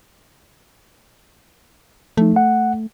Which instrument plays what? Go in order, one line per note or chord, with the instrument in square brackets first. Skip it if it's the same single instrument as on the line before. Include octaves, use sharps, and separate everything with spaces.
[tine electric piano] F3 D#4 [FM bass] A3
[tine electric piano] F#5